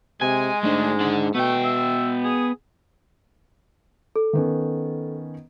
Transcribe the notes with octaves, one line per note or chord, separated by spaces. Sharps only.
C3 G#3 G#5
G#2 A3 D4
D4 F#5
B2 A3 B3 G5
E5
G#4
A4
D#3 B3 C#4